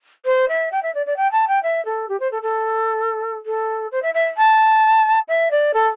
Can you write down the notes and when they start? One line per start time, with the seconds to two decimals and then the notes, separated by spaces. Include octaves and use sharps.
0.25 C5
0.49 E5
0.72 G5
0.83 E5
0.94 D5
1.06 D5
1.17 G5
1.32 A5
1.48 G5
1.63 E5
1.85 A4
2.09 G4
2.20 C5
2.31 A4
2.42 A4
3.46 A4
3.92 C5
4.02 E5
4.14 E5
4.37 A5
5.28 E5
5.51 D5
5.74 A4